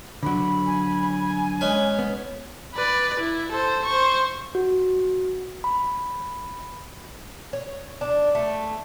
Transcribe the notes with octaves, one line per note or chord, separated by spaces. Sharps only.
D3 F#3 B5
G#5
G#3 C#4 B4 C#5
B3
B4 D5
E4
A4 C5
C5 C#6
F#4
B5
C#5
D4
A3